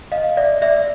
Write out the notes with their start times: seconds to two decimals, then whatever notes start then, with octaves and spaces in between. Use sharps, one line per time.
0.12 D#5 F5
0.37 D5 E5
0.62 D5 E5